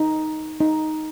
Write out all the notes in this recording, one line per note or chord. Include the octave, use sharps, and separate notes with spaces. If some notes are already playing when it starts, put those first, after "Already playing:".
Already playing: D#4
D#4